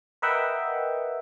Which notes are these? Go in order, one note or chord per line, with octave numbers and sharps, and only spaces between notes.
A#4 B4 D#5 E5 F#5 G5